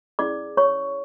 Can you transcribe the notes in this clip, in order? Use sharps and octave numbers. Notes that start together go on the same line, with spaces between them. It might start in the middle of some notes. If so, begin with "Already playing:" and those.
C#4 E4 G#4 D5 D6
C#5 C#6